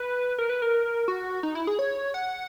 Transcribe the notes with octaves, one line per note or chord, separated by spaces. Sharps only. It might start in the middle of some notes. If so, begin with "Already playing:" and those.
Already playing: B4
A#4
B4
A#4
F#4
D#4
E4
G#4
C#5
F#5